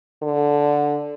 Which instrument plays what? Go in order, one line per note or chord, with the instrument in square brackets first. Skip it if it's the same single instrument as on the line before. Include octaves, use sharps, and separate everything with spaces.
[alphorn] D3